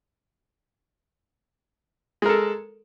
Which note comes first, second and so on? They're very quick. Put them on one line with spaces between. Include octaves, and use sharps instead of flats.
G#3 A#4 A4